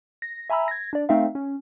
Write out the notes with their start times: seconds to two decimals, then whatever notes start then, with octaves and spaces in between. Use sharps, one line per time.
0.22 A#6
0.50 E5 G#5 A#5 B5 E6
0.68 G#6 A#6
0.93 D4 D5
1.09 A3 C4 D#4 E5 F5
1.35 C#4